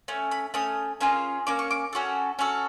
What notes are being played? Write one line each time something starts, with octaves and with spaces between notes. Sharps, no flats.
A3 C#4
B5
A3 C#4 D#6
A#3 C#4 F4 G#4
A#3 C#4 D6
C#6
D6
C#4 F#4 A4
C#4 F#4 A4